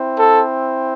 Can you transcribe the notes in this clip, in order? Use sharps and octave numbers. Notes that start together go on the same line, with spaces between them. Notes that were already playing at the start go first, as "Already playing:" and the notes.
Already playing: C4 E4
A4